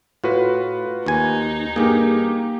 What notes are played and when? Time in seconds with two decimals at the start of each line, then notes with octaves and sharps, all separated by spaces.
0.24 A2 F4 F#4 B4
1.06 D#2 D#4 G#5
1.76 G2 A#3 G4 G#4